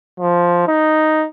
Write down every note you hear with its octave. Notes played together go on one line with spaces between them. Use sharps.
F3
D#4